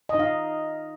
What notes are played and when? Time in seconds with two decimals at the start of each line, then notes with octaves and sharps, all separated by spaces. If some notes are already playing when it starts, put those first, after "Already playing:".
0.09 D#5
0.14 D#4
0.19 F5